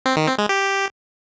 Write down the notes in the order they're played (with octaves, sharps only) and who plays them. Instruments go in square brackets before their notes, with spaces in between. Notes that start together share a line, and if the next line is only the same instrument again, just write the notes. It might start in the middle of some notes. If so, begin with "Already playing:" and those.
[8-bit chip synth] C4
D#3
C4
G#3
G4